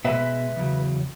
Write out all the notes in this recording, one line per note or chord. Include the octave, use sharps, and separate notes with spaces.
B2 G#3 B4 E5
E2 C#3 F#3